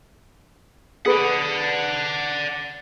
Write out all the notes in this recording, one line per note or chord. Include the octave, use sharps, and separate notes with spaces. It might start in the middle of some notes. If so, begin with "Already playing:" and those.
G#4 B4 D5 F#5